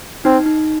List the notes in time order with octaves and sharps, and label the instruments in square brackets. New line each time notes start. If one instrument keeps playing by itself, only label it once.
[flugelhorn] C4 [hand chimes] D#4
[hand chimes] D#4